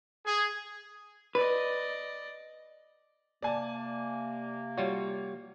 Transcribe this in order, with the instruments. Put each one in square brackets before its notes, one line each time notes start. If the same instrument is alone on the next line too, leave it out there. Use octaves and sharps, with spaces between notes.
[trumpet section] G#4
[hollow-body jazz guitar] B4 [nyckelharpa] D5 D#5
[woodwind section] C3 A#3 [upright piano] D5 G#5 A5
[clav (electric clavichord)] G3 F4 F#4 [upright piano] C#5